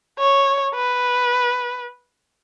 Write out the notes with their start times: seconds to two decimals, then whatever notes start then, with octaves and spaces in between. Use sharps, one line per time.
0.19 C#5
0.75 B4